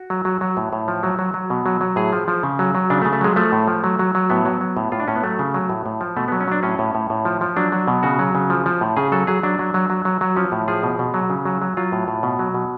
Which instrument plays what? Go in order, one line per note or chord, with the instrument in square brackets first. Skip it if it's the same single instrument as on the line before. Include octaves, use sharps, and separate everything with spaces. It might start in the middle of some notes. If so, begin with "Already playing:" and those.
Already playing: [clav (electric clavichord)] F#4
F#3
F#3
F#3
A2
A2
F3
F#3
F#3
F#3
B2
F#3
F#3
A2 G#4
F3
F3
C#3
F#3
F#3
C#3 D4
A3
C#3
A3
F#3 G#3
F3 A3
A2
F3
F#3
F#3
F#3
A2 B3
F#3
F#3
A2
A2 F4
D4
A2 C#4
B3
F#3 A3
C#3
F#3
A2
A2
F3
B2 A3
B3
F#3
C#4
F#3 D4
A2 C#4
A2
A2
A2
F3
F3
F#3 D4
F#3
B2
C#3 F#4
F#3
C#3
F3
F3
A2
C#3 G#4
F#3 A4
F#3 G#4
F#3 D4
F#3
F#3
F#3
F#3
F#3
F3 C#4
A2
F3 G#4
B2
B2
F#3
C#3
F#3
F#3
F#3 F4
A2
A2
B2
F#3
B2